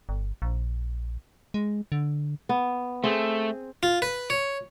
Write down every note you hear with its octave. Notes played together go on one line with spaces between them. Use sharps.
G1
A#1
G#3
D3
B3
A3 C4 G#4
F4
B4
C#5